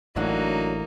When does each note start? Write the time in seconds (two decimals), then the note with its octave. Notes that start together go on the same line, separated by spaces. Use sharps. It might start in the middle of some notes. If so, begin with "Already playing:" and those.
0.16 A1 A2 F#3 A#3 D4 D#4 F#4